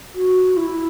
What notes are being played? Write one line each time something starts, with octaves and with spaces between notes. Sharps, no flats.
F#4
E4